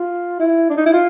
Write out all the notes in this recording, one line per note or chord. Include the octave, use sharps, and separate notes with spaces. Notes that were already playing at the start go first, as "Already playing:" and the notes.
Already playing: F4
E4
D4
D#4
E4
F4